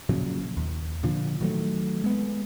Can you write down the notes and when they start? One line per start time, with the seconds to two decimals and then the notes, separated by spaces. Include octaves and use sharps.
0.09 A#2 C#3 F3 F#3
0.57 D#2
1.03 A#2 D3 F3
1.41 D#3 F#3 A3
2.04 G#3 B3